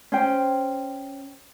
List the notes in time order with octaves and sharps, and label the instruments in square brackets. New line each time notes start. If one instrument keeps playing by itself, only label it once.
[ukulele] C#4 C5 G5